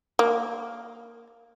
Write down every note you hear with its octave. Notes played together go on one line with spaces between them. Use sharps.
A#3